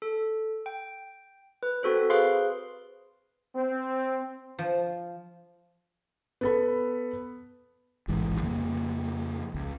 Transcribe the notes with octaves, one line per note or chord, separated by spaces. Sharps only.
A4
G5
B4
C4 F#4 A4 C5
G#4 B4 C5 F5 C6
C4
F3
B3 A4 B5
E1 A1 G#2 E3
F2 C#3 F3 A#3
C#2